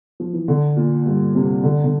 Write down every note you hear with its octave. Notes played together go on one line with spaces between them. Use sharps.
F3
E3
D3
A#2
G2
C3
D3
D3